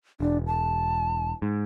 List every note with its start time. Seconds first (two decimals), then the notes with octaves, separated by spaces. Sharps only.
0.20 E1 D4
0.47 A5
1.42 G#2